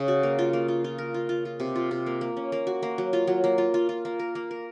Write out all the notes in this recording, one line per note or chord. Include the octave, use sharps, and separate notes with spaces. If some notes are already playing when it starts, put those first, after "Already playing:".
Already playing: C#3
F#4
A#3
F4
A#3
F4
F4
A#4
F4
F4
F4
C3
F4
C3
A#3
A#3
C#4
A#3
F#4
A#3
F#3
F4
F#3
A#3
F4
F4
F4
A#3
A#4
A#3
A#4